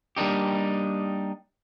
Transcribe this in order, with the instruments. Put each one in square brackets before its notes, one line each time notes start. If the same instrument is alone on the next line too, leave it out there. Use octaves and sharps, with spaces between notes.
[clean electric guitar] G3 A#3 D4 D#4 G4